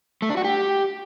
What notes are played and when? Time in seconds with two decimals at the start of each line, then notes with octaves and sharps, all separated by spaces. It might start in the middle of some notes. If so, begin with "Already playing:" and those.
0.22 A3
0.30 D4
0.37 F#4
0.44 G4